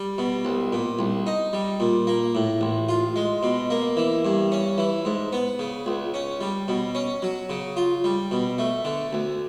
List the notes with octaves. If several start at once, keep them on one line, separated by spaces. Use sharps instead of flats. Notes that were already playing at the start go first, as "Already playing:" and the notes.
Already playing: G3
B2
C2
A#2
C2
D#4
G3
A#2
A#3
A2
A1
F4
G#3
B2
A#3
E3
G2
C#4
E3
G#2
B3
C#3
C#2
C#4
G3
B2
C#4
F#3
C#3
F4
G3
B2
A3
D3
D2